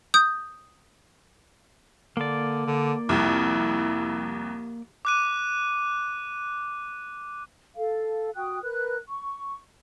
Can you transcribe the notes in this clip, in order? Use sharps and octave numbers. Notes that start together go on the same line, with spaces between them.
D#6 G6
D3 A#3 D5
D3
C2 F2 E4
D6 F#6 D#7
A4 F5
F#4 G5 D#6 F#6
A#4 B4 F#6
C#6